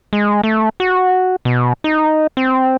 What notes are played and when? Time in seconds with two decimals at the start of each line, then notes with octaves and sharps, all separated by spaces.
0.13 G#3
0.44 A3
0.80 F#4
1.45 B2
1.84 D#4
2.37 C4